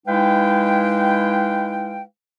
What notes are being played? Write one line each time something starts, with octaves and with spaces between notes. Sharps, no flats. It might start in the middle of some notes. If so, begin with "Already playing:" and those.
G#3 D#4 E4 B4 F5 G5